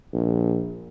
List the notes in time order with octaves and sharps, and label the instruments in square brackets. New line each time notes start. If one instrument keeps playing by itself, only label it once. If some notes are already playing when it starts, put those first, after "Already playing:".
[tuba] A#1